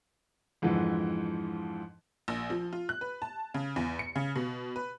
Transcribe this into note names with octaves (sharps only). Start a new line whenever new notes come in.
F2 G#2 D3 E3 F3
A#1
F3
F4
F#6
B4
A5
C#3
E2
C#7
C#3
B2
B4